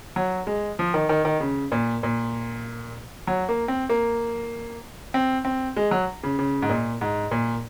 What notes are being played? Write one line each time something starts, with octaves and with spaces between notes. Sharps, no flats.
F#3
G#3
F3
D#3
D#3
D#3
C#3
A#2
A#2
F#3
A#3
C4
A#3
C4
C4
G#3
F#3
C#3
C#3
G#2
A#2
G#2
A#2